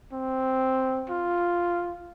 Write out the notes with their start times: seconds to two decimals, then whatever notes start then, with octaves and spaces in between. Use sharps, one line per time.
0.13 C4
1.10 F4